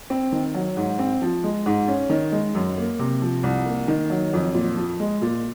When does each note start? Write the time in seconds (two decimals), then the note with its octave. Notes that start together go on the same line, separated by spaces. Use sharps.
0.10 C4
0.32 D#3
0.54 F#3
0.77 G#2
0.99 C4
1.22 F3
1.44 G#3
1.66 G#2
1.88 C#4
2.10 D#3
2.32 G#3
2.55 F#2
2.78 A#3
2.99 C3
3.22 F3
3.43 C2
3.66 A#3
3.88 D#3
4.10 F#3
4.33 F2
4.54 A#2
4.77 F3
5.00 G#3
5.22 A#2